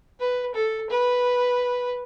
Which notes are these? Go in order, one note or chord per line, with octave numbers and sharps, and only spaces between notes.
B4
A4
B4